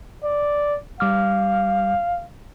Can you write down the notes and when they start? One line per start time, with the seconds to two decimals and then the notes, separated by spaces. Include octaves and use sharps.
0.24 D5
1.00 G3 F5 D6 F6